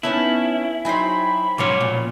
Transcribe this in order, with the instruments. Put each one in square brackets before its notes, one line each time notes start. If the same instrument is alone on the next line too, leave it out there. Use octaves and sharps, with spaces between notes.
[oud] B3 C#4 D#4 [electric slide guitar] E4 [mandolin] G#5 A5 E6
[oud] F#3 D#4 [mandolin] C5 G5 G#5 [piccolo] B5
[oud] G#2 F#3 [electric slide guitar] B2 F3 C#5 [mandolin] C#4 C6 D6
[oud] A#2